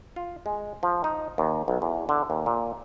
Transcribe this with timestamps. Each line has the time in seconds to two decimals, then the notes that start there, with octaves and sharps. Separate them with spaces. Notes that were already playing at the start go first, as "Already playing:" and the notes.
0.16 F4
0.46 G#3
0.83 F3
1.04 D#4
1.38 D#2
1.68 B1
1.82 E2
2.09 D3
2.30 D#2
2.46 A#2